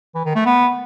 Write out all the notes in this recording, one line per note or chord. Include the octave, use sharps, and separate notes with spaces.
E3
D#3
A3
B3